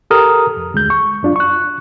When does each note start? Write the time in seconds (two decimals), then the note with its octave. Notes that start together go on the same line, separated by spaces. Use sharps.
0.10 G4 A4 A#4 A#5 D#6 F6
0.57 F2
0.74 D2 G#3 G6
0.90 C#6
1.23 F#2 D4 F4
1.36 C#6 F#6